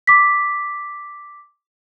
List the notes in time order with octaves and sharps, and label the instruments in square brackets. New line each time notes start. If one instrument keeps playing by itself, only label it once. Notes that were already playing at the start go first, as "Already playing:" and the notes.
[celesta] D6 B6